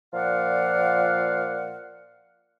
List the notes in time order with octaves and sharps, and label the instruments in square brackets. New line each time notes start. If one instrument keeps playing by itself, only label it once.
[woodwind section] A#2 F3 D5 F5 F#5